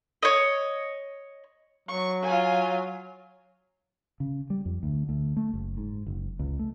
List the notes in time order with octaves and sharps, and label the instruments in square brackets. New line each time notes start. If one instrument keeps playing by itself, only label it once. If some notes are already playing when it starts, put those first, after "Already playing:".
[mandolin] C#5 D#5
[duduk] F#3 [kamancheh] C#6
[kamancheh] F4 G#5
[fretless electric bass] C#3
G3
F2
D2
D2
A3
F#1
G#2
F#1
C#2
A3